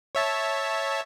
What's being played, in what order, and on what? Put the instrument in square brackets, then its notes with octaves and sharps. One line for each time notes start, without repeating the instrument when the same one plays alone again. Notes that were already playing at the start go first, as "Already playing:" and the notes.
[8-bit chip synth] C#5 E5 A5